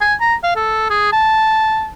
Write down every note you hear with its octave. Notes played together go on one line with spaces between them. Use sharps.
G#5
A#5
F5
A4
G#4
A5